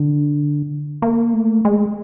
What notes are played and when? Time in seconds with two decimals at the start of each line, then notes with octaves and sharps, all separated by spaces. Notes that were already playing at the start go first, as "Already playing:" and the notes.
Already playing: D3
1.02 A#3
1.33 A3
1.65 G#3